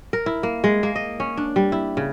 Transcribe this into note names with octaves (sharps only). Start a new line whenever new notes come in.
A#4
E4
A#3
G#3
A#3
D#5
C#4
D4
G3
E4
C#3